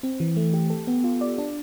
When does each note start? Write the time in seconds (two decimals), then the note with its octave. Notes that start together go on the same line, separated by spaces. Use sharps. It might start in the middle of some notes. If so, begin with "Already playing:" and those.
0.03 C4
0.20 E3
0.37 A3
0.53 G4
0.70 A4
0.87 B3
1.04 F4
1.21 D5
1.38 D4